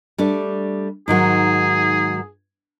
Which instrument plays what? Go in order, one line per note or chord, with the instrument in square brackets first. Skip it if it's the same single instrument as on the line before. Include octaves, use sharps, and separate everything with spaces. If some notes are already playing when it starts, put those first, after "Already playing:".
[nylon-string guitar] G3 A3 D4
[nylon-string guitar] G#2 D#3 F#3 [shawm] G#4